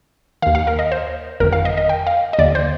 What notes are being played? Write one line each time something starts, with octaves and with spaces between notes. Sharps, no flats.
D#2 D#3 F5
F5
A#4
D#5
C5
G1 F2 D#3 A#4
F5
D#5
D#5
G5
F5
D#5
D#2 D3 D5
C5